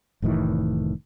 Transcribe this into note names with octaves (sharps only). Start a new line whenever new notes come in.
F1 A2 D#3 E3